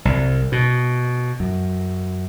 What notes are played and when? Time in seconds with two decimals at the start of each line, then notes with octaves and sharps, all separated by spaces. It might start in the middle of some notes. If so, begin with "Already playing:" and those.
0.05 C2
0.52 B2
1.40 F#2